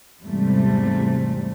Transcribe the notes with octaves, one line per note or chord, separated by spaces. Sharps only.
E2 G#2 C3 G3 A3